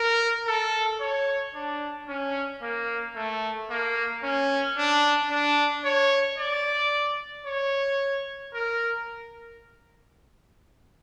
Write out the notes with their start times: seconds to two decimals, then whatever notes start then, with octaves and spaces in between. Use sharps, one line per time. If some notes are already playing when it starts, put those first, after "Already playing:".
Already playing: A#4
0.47 A4
1.00 C#5
1.54 D4
2.08 C#4
2.62 A#3
3.16 A3
3.70 A#3
4.23 C#4
4.77 D4
5.31 D4
5.85 C#5
6.39 D5
7.46 C#5
8.54 A#4